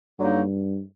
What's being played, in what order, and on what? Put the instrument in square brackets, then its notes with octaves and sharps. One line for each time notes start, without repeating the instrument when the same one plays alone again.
[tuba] G2 [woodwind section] D3 F#3 A#3 D#4